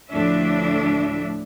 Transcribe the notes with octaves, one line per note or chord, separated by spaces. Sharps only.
D2 A2 F3 A3 D4 E5